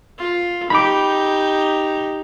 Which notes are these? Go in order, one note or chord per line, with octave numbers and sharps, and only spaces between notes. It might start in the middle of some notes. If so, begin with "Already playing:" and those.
F4
D#4 G4 B5 D6